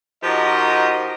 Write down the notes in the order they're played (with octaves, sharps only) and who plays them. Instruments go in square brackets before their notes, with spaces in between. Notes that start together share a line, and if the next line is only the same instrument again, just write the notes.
[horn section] F3 D#4 F#4 G4 A#4 D#5